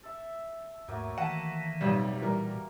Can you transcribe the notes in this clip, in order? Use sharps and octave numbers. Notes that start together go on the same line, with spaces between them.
A4 E5
D#2 G#2 F#3 A3 A#3
D#3 E3 F#5 A5
B1 F2 G3
A#2 E3 G3 A#4